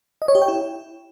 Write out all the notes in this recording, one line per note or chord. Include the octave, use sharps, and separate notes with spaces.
D#5
C#5
G4
G5
E4